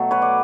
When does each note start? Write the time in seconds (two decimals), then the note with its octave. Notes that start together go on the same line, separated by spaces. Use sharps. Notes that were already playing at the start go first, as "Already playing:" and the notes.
Already playing: B2 F#3 A3
0.11 B4 C#5
0.22 D5